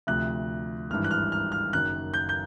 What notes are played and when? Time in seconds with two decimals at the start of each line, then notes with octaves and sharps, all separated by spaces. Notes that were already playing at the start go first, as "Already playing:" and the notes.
0.07 D2 C3 F3 F#6
0.90 G#1 G2 E3 F6
1.04 F#6
1.11 F6
1.32 F6
1.52 F6
1.73 F#1 F#2 D#3 F#6
2.14 G6
2.29 G6